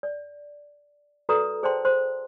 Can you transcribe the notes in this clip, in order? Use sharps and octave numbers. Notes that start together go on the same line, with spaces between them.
D5
F#4 A4 B4 D5 A#5 D#6
G#4 C5 D5 G5 A5 C6
C5 C6